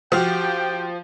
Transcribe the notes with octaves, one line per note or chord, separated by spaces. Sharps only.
F3 F#4 G4 F5 G5